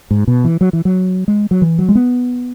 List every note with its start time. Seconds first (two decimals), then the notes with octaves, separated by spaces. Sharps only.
0.11 G#2
0.27 B2
0.44 E3
0.61 F#3
0.73 E3
0.85 F#3
1.28 G#3
1.51 F#3
1.62 E3
1.79 F#3
1.89 G#3
1.95 B3